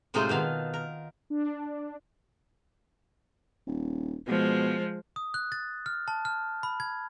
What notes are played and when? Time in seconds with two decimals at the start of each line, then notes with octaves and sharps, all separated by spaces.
0.14 A2 C3 G#3 D#4 F4 C5
0.29 B2 D#3 F5 A5
0.74 A#4
1.30 D4
3.67 D#1
4.28 B2 F3 G#3
5.16 D#6
5.34 F#6
5.52 A6
5.86 F6
6.08 A5
6.25 F6
6.63 B5
6.80 G#6